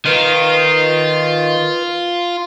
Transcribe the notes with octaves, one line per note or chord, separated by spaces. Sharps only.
D#3 F4 B4